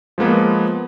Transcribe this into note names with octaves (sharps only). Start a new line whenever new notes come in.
F3 G#3 A#3 B3 B4